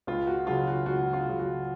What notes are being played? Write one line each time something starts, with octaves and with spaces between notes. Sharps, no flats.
C#2 F4
F#4
C#3 F#3 F4
F#4
C#2 F#4
F4
C#3 F#3
F#4